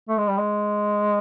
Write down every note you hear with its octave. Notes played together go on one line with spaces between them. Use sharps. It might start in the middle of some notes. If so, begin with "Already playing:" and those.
A3
G#3
G3
G#3